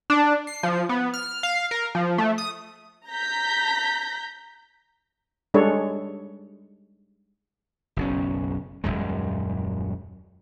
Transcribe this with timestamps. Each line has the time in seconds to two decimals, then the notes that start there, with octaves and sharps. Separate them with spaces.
0.10 D4
0.47 C7
0.63 F3
0.89 B3
1.14 F6
1.43 F5
1.71 A#4
1.95 F3
2.18 A3
2.38 D#6
3.09 A#5 G6 A#6 B6
5.54 G3 G#3 D4 A4 C#5
7.96 F#1 B1 C#4
8.84 D#1 C#2 F#2 G#3